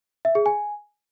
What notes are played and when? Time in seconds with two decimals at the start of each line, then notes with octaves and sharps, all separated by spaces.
0.25 E5
0.35 G#4
0.46 G#5